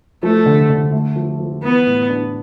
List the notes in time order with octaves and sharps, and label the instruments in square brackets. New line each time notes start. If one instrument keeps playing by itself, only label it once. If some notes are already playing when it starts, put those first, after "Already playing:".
[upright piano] F3 [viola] A3
[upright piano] D3
D3
A3
F3
F3
[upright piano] E3 [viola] B3
[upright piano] A2
D4